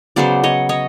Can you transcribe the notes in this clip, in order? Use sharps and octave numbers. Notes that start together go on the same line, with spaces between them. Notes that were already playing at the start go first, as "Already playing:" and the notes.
C#3 F#3 B3 C5 D5
C#5 D#5
C#5 D#5